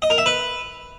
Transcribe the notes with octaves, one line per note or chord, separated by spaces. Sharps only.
D#5
A#4
E5
B4